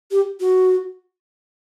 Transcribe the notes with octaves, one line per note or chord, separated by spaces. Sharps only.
G4
F#4